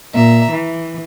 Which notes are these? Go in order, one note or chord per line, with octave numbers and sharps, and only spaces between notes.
A#2 E5 A#5
E3